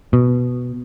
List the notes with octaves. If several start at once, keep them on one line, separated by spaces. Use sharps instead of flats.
B2